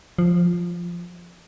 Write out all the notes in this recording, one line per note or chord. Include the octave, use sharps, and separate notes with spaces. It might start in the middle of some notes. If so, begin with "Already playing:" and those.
F3